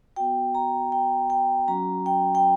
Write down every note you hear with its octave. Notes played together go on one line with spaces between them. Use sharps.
B3 F#4 G5
A#5
G5
G5
F#3 C#4 F#4 A#5
G5
G5